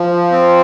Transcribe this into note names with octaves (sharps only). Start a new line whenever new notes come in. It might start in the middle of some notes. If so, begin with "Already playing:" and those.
Already playing: F3
C4